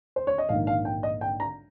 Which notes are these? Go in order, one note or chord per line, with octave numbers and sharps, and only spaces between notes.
C5
C#5
D#5
A#1 G#2 D#3 A#3 F5
F5
G5
D#5
G5
A#5